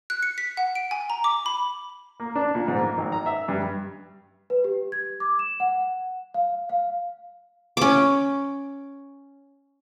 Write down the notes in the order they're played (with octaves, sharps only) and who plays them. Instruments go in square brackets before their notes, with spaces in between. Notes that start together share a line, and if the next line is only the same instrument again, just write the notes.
[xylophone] F#6
C#7
B6
F#5
D7
G#5
A#5
D6
B5
[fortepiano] A#3
D4
A#2
G#2
A#3
G#1
A#5
E5
G2
[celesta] B4
G4
G#6
D6
E7
F#5
F5
F5
[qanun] C#4 D6